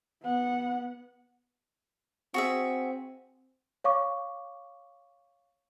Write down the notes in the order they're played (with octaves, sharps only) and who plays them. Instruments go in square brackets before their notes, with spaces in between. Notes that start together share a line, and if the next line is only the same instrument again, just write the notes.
[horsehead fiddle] B3 F#5
[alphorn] C4 [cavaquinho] F#4 G#4 E5
[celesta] C#5 F5 C#6 D6